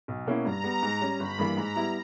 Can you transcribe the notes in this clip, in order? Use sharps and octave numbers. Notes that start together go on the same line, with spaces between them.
B1
B2 A#3 C#4 E4
G2 A#5
G3 B3
G#2
G3 C#4
G1 B5
G2 E3 A#3
G#2 A#5
G3 B3 E4